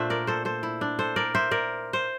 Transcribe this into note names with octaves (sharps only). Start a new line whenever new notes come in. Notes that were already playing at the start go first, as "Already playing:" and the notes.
Already playing: A#2 A3 D4 C5 E5
A#4 D5
A4 C5
A4 C5
E4
D4
A4 C5
A#4 D5
C5 E5
A#4 D5
C5